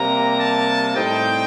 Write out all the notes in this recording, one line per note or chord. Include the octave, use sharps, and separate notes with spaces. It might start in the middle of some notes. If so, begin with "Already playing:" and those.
Already playing: C3 G3 A#3 A#5
A5
A2 G3 C4 D#4 G5